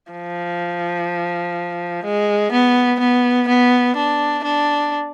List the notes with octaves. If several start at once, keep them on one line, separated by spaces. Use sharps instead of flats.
F3
G#3
B3
B3
B3
D4
D4